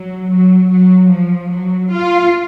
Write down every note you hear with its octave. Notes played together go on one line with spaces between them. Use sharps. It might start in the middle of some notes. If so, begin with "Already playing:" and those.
Already playing: F#3
F#3
F#3
F3
F#3
F4